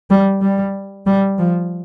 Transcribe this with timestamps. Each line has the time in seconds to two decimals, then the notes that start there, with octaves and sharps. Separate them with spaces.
0.10 G3
0.41 G3
1.06 G3
1.38 F3